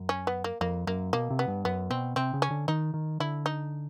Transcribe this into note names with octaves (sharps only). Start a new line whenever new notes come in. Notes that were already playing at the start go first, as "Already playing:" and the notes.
Already playing: F#2
C#4
B3
A#3
F2 A#3
F#2 A#3
B2 A#3
C3
B3
G2
F#2 B3
B2 C4
C3 C4
C#3
C#4
D3
D#3 D#4
D#3
D3 E4
D#4